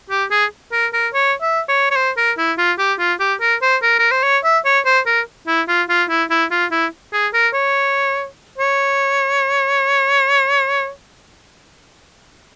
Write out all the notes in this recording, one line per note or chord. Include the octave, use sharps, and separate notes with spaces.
G4
G#4
A#4
A#4
C#5
E5
C#5
C#5
C5
A#4
E4
F4
G4
F4
G4
A#4
C5
A#4
A#4
C5
C#5
E5
C#5
C5
A#4
E4
F4
F4
E4
E4
F4
E4
G#4
A#4
C#5
C#5